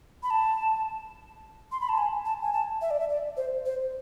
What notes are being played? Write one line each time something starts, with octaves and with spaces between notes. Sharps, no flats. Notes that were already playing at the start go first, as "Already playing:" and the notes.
B5
A5
C6
B5
A5
G#5
A5
G#5
A5
E5
D5
E5
D5
C5
C5